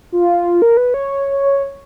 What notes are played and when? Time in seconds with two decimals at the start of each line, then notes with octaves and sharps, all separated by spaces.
0.12 F4
0.62 A#4
0.77 B4
0.94 C#5